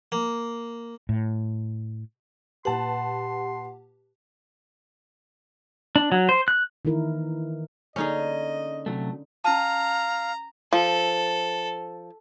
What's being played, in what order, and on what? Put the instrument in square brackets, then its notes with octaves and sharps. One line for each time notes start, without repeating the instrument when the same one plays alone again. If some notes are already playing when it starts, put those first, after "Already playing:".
[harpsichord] A#3
[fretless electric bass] A2
[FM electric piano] A#2 G4 [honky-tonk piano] B4 A5 [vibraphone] F#5 [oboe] C6
[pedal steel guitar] D4
F#3
C5
F#6
[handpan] D#3 E3 E4 A#4
[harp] D3 A#3 A4 [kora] C#4 D#4 G#4 [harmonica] D#5
[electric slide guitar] C3 F#3 A3
[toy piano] C#4 A5 [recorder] F5 [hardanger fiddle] A#5
[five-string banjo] F3 [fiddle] A4